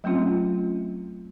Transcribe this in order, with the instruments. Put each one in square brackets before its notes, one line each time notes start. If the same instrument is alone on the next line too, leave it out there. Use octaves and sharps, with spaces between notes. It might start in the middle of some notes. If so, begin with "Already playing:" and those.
[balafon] F#3 A3 C4 C#4 F4